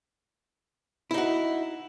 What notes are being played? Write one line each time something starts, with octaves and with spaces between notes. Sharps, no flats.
D#4 E4 F#4